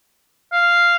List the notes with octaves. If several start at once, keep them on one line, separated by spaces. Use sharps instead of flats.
F5